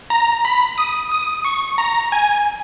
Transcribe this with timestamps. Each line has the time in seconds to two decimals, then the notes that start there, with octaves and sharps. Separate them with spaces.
0.10 A#5
0.45 B5
0.78 D#6
1.12 D#6
1.45 C#6
1.78 A#5
2.12 G#5